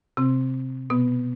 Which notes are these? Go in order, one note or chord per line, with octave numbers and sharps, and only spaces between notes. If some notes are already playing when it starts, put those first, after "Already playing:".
C3 C4
B2 B3